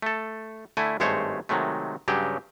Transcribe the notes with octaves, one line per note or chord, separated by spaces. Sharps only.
A3 A4
D3 A3 E4 G#5
G#1 G2 G#3 A3 C5 C#5
C3 D#3 F#3 G#3 A3
G2 C#3 F#3 G4